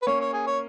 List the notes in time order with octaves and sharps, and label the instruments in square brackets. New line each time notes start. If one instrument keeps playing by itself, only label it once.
[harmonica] B4
[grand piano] A#3 C#4 [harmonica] C#5
[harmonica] C#5
G#4
C#5